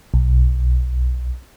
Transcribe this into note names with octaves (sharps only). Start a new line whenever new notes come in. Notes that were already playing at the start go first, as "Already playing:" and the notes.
B1